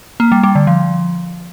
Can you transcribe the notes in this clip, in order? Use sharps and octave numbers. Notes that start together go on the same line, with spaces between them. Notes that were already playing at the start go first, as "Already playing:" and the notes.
A#3
G3
G3
D3
F3